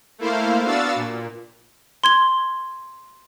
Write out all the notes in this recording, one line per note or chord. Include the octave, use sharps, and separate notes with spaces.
A3 A#3 E4 C5 F5
B3 D4 F#4 F5 E6 A6
A#2
C6 G#6 G7